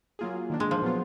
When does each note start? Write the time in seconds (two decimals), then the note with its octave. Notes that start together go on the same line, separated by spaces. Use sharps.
0.19 F#3 A#3 F4 G#4
0.50 D#3 A#3 D4
0.60 G#3
0.71 F3
0.82 A#2 F#3 B3 F4